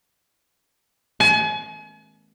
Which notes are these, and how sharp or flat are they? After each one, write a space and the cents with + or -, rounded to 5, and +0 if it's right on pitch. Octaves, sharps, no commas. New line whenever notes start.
G#5 +40